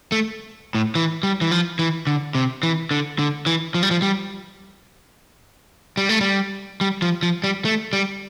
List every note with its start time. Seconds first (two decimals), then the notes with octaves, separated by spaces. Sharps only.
0.12 A3
0.75 A2
0.95 E3
1.23 G3
1.41 E3
1.51 F3
1.79 E3
2.07 D3
2.35 C3
2.63 E3
2.91 D3
3.19 D3
3.46 E3
3.75 F3
3.83 G3
3.91 F3
4.02 G3
5.97 G3
6.09 A3
6.21 G3
6.81 G3
7.02 F3
7.23 F3
7.44 G3
7.65 A3
7.93 G3